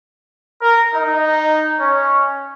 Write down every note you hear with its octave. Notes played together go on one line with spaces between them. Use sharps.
A#4
D#4
C#4